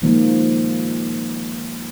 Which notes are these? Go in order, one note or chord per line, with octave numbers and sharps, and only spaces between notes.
D#3 F3 G#3 A#3